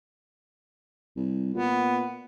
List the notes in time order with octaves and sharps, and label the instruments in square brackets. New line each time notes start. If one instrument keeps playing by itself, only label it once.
[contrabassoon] C2
[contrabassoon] A#2 [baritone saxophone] B3